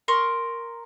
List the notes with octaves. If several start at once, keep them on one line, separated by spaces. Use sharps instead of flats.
A#4 C6 C#6